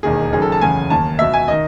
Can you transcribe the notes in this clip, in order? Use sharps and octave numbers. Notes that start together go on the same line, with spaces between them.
E1 D#2 D#3 G#4
F#1 F#2 D#3 G#4
A4
A5
F#1 E2 C#3 G#5
D#2 D#3 A5
C#2 B2 E5
G#5
D#3 D#5